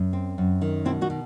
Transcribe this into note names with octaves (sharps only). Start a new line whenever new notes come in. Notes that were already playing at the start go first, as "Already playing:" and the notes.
Already playing: F#2
C4
F#2
D#3
B2 C4 E4
D#4 F#4
B2